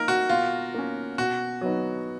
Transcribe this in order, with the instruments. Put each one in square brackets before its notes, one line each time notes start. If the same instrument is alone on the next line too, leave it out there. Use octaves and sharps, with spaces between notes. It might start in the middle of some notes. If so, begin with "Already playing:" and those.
Already playing: [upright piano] F3 A#3 D#4 [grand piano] A#4
[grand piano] F#4
[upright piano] B2 [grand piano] F4
[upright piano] A#3 C#4
[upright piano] B2 [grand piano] F#4
[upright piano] F#3 B3 D#4